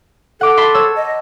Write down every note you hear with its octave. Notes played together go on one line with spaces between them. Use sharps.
A4 F#5 D6
A5 B5 C6
C#5 E6
D#5